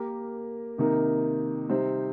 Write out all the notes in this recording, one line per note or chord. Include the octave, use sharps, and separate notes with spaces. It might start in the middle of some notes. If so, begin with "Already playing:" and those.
Already playing: A#3 G4 A#4
C3 D#3 A#3 D#4 A#4
C3 G3 C4 D#4 C5